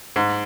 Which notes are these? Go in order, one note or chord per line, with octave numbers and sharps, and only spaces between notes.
G#2